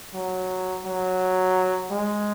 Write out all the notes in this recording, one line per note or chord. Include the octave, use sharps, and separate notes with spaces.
F#3
F#3
G#3